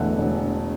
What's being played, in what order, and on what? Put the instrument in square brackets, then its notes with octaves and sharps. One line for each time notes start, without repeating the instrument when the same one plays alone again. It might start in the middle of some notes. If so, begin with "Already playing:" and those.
Already playing: [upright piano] E1 E2 D3 A3 F#5
E1